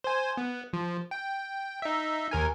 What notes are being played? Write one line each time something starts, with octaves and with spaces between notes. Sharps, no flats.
C5 G#5
B3
F3
G5
D#4 E5
D#2 A#4 G#5